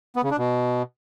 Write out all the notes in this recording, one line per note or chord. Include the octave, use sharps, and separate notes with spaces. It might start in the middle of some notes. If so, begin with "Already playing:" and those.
B3
C#3
D4
B2